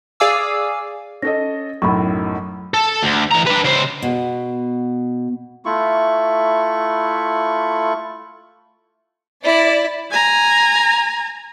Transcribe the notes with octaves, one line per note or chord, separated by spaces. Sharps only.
G#4 D5 F5 G#5 D6 E6
C#4 A4 D#5 A#6
B1 F#2 A2 B5 C#6
A4
D2
E3 A#5
D4 B4
C#3 C5
B2
A3 E4 F4 C#6
E4 D5
G#5 A#5